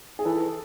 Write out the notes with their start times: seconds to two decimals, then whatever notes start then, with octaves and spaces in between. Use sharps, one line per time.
0.19 G#4
0.25 E3 A4